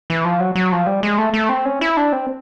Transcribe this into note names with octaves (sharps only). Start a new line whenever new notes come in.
E3
F3
F#3
F#3
F3
G3
G#3
A3
A3
C4
C#4
E4
D4
C4